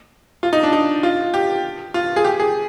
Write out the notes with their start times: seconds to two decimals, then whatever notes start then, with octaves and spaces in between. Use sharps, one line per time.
0.43 F4
0.53 D#4
0.63 D4
0.73 D#4
1.03 F4
1.34 G4
1.94 F4
2.16 G#4
2.24 G4
2.40 G#4